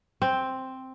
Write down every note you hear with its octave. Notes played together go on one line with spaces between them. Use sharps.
C4